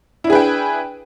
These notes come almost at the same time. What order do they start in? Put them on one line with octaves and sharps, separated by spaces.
E4 D4 G#4 B4 G5